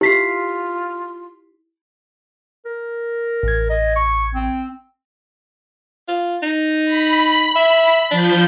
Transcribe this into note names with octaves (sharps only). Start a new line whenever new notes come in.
E4 F4 G4 B6 C7
A#4
A1 G#6
D#5
C#6
C4
F4
D#4
B5
E5
F3 D4 G6